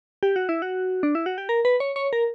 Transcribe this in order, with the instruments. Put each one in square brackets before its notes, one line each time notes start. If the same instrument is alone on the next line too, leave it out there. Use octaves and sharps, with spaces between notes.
[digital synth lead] G4
F#4
E4
F#4
D4
E4
F#4
G4
A#4
B4
C#5
C#5
A#4